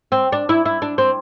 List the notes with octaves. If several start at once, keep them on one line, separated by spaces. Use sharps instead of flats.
C4
D4
E4
E4
D4
C4